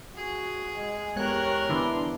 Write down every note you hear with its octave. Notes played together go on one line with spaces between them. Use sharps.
F#4 G#4
G#3
E2 G#3 B3 G4 A#4 C#5 F#6
D3 E3 B3 D4 E4 C6